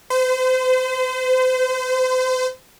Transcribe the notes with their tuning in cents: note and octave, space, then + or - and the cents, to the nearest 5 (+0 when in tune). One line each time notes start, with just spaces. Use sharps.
C5 -35